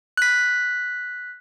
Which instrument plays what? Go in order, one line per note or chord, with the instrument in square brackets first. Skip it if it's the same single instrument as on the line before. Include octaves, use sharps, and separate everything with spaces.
[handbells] F#6 B6